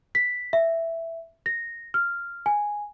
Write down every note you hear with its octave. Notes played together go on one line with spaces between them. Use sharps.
B6
E5
A#6
F6
G#5